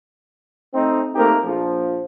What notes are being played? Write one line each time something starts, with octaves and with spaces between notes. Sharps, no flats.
A3 C4 D#4
A3 A#3 C4 D#4 G4 A#4
A#1 F3